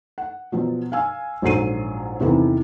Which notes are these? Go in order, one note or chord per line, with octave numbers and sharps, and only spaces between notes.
F#5
B2 F3 F#3
F5 G#5 E6
A#1 G#2 F#3 A4 C7 D#7
E2 C3 D#3 E4 A4 B4